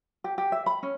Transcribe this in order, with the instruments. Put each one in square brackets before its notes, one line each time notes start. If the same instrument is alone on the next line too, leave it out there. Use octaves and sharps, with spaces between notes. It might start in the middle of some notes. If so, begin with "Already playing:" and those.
[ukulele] G4
G4
E5
B5
C#4